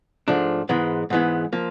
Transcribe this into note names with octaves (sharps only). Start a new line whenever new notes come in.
G#2 F3 A3 D4
G#2 E3 G#3 B3
G#2 E3 G#3 B3
F3 A#3